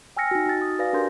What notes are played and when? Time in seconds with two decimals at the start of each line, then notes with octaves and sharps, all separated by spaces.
0.17 G5 G#5 E6 F6 A#6 C#7
0.31 D#4 F#4
0.46 D#4 F#4 A5 A6
0.62 D#6
0.79 F#4 B4 D5 F5 G#5 A#6
0.93 D4 G4 A#4 D5 C6 G6